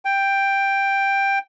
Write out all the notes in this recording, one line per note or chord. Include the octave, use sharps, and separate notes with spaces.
G5